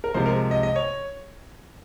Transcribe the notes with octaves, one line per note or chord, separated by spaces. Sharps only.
A#4
C3 F3 G#3 C5
A#4
D#5
D#5
C#5